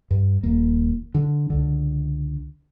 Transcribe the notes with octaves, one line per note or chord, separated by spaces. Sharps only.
G2
D#1 A#3
D3
C#2 D3